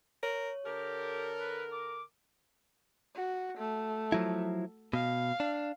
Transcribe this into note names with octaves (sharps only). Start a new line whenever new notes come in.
A#4 C#5
D3 G4 A4 A#4
B4
D6
F#4
A3
F3 F#3 E4
B2 F5
D4